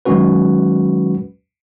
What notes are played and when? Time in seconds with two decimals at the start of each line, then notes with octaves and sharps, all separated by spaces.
0.05 D#3 F#3 G#3 C#4 F#4 B4